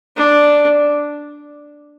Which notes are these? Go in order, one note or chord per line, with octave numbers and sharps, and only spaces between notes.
D4